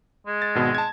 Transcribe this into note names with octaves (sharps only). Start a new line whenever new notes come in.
G#3
A6
G#1 B2 B3
A5 G#6